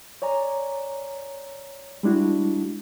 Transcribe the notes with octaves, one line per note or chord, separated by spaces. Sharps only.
C#5 D5 G#5 A#5
G3 G#3 D4 E4 F#4